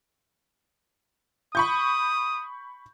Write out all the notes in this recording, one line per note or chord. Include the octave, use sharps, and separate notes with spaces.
B5 C#6 D#6 G6